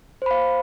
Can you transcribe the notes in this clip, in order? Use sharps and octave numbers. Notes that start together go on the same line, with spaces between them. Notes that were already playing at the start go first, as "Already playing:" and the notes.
C5 F5 B5